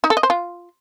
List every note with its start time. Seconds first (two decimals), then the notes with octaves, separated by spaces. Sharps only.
0.04 D#4
0.10 A4
0.17 D#5
0.23 C5
0.30 F4